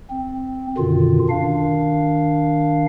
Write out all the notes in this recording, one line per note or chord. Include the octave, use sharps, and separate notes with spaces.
C4
F#2 B2 D3 D#3 F4
D#3 D4 F5